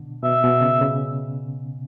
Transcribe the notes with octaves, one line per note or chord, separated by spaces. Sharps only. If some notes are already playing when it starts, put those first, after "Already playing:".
Already playing: B2 D3
B2 E5
B2
C#3
C#3